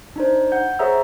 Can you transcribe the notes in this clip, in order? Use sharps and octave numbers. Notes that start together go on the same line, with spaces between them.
D4 D#4 C5
F#5 G6
G#4 C5 C#5 E5 A#5 E6